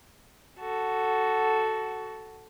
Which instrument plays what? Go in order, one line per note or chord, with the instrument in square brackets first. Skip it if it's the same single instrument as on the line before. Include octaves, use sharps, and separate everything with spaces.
[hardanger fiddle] F#4 A4